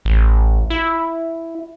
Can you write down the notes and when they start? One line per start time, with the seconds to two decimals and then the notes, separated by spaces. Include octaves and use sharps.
0.05 A1
0.70 E4